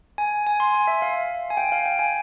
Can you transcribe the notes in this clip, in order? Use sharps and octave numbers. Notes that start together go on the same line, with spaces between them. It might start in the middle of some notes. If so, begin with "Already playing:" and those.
G#5
G#5
C6
G#5
E5
F5
G#5
G5
F5
G5
G#5